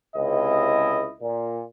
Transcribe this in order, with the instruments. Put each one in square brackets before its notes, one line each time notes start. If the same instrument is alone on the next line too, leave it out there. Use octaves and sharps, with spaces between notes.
[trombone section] C#2 C3 [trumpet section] E4 D#5
[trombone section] A#2